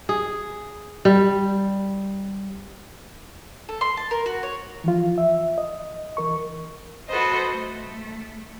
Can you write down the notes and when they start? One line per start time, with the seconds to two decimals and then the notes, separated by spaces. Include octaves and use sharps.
0.09 G#4
1.05 G3
3.69 A4
3.81 C6
3.97 A5
4.11 A#4
4.26 F#4
4.43 C#5
4.84 E3 F3 F4
5.18 E5
5.58 D#5
6.17 E3 A#4 C#6
7.08 F#4 A4 B4 C5 D#5
7.53 A3